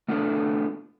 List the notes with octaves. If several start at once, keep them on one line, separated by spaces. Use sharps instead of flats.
A3 B3 D4 F4 G4 A4